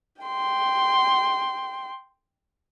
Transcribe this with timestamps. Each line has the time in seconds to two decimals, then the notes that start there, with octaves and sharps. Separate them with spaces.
0.22 G5 C6